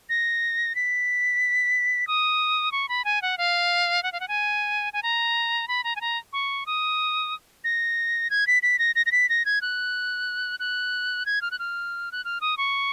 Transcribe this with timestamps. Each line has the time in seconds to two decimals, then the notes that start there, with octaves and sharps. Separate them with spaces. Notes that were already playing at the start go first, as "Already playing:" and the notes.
0.09 A#6
0.75 B6
2.07 D#6
2.72 C#6
2.89 B5
3.05 G#5
3.22 F#5
3.38 F5
4.03 F#5
4.12 F5
4.20 F#5
4.28 G#5
4.93 G#5
5.03 A#5
5.68 B5
5.84 A#5
5.96 G#5
6.01 A#5
6.33 C#6
6.66 D#6
7.64 A#6
8.30 G#6
8.47 B6
8.63 B6
8.79 A#6
8.95 A#6
9.06 A#6
9.12 B6
9.29 A#6
9.45 G#6
9.62 F#6
10.60 F#6
11.26 G#6
11.42 F6
11.51 F#6
11.59 F6
12.12 F#6
12.25 F6
12.41 D#6
12.58 C#6